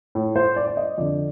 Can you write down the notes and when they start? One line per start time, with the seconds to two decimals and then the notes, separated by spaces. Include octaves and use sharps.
0.15 A2
0.36 C5
0.56 D5
0.67 D5
0.77 D#5
0.98 F2 D3 D5